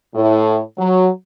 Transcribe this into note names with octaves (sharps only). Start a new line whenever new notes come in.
A2
F#3